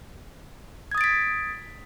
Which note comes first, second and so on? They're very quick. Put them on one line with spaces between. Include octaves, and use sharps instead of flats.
G#6 D#6 A6 D7 B6